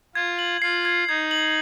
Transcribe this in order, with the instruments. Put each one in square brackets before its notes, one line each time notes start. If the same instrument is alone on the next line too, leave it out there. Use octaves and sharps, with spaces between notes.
[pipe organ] F4 [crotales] G#6
[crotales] F#7
[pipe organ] F4 [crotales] C7
[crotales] G#6
[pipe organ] D#4 [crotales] G#6
[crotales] F#7